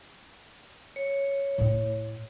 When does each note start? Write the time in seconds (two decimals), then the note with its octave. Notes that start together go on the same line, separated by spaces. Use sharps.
0.96 C#5
1.58 A2 E4